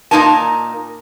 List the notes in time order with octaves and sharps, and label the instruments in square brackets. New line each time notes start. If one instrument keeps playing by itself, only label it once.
[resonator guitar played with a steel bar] A#2 G3 D#4 A#4 A5